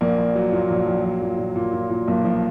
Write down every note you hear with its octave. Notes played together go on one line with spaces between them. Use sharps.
A#1 A#3
A#1
F#3
A#2
A#1
A#1
A#1
A#2
A#2
A#2
A#2
A#2
B1 A#3
F3